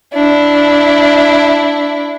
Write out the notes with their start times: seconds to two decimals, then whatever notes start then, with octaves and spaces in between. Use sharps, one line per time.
0.14 D4 E4